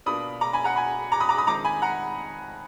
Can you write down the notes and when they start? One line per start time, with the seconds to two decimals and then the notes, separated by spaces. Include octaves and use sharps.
0.06 B2 A#3 D4 F4 B5 D#6
0.41 A#5 D6
0.53 G#5 B5
0.64 F#5 A#5
0.76 G#5 B5
1.12 A#5 D6
1.20 B5 D#6
1.29 A#5 D6
1.38 B5 D#6
1.47 F2 D#3 G#3 D#4 A#5 D6
1.64 G#5 B5
1.82 F#5 A#5